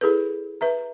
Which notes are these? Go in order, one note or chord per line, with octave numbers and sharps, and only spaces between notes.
E4 G#4 A4 B4
B4 E5 A#5